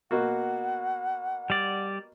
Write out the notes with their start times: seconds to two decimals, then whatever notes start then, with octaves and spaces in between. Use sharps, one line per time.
0.11 B2 A#3 F#4 F#5
1.50 G3 D5